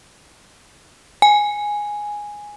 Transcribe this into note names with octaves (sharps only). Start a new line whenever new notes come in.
G#5